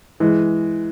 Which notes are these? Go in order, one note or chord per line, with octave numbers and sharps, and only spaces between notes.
E3 G#3